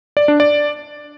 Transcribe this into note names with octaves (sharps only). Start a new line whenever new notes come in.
D5
D4
D5